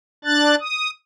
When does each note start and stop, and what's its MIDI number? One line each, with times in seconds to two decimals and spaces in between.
0.25 0.55 62
0.25 0.55 90
0.25 0.55 93
0.60 0.90 87